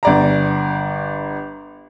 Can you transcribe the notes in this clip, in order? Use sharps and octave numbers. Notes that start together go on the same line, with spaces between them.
G1 D5 A#5